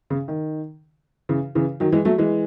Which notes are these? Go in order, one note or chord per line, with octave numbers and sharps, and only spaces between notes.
C#3
D#3
C#3 E3
C#3 E3
D#3 F#3
E3 G#3
F#3 A3
E3 G#3